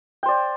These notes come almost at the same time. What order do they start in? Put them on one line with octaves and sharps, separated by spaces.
G5 C5 D5